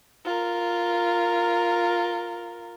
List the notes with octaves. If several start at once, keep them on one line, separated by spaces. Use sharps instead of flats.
F4 A#4